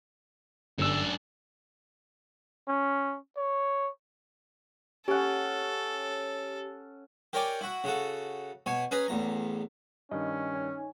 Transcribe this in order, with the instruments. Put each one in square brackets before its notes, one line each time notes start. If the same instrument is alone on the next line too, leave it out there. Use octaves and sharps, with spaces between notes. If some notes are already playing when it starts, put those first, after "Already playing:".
[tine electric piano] G1 E6 [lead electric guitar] F#2 D4
[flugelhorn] C#4
C#5
[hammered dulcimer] C#4 F#5 [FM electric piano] G4 [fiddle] A4
[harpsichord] G4 A#4 C#5 D5 G5 G#5
E4 F#4
C#3 F#4 A4
B2 C#5 G#5
C#4 G#4 B4 G#5 A#5
A1 E2 A#5
[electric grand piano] G2 D#3 [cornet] C#4 [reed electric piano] D#5
[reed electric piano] D#4 C#5 G#5